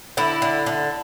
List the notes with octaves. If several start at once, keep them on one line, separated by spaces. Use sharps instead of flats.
D3 E4
D3
D3